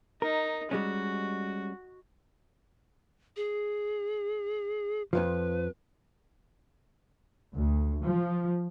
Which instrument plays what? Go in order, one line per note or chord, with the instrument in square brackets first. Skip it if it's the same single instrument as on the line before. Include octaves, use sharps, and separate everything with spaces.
[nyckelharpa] D#4 [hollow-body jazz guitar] A#4
[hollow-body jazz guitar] G3 G#3 C#4 [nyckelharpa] F#4
[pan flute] G#4
[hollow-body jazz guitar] F2 G#2 F3 [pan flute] B4
[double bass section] D2
F3